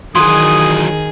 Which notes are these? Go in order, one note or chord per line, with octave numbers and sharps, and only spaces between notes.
D#3 E3 F#3 F#4 G#4 C6 D#6